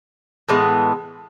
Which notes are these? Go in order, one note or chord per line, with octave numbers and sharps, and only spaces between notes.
A2 E3 G#3 B3